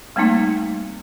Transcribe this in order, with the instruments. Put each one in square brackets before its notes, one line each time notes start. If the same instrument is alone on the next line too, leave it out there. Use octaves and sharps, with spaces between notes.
[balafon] G3 A3 A#3 C4 D#4